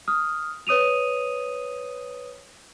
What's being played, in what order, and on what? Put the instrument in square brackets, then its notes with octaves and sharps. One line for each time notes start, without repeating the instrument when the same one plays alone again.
[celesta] D#6 F6
B4 C#5 D#6 D#7 F7